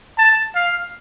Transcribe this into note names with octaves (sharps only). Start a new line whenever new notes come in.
A5
F5